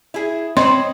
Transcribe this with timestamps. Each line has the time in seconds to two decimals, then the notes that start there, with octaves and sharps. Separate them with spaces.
0.14 E4 G#4
0.57 C4 C5 C#5 D#5 B5 C6